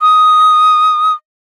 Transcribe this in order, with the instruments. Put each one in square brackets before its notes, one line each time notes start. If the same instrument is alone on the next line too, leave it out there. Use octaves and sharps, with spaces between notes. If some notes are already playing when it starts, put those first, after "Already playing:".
[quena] D#6